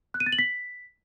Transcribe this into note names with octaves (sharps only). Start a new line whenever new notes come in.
F#6
D#7
A6
F#7
B6